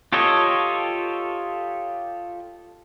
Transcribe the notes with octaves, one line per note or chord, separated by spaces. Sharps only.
F4 G4 A4 C#5 D#5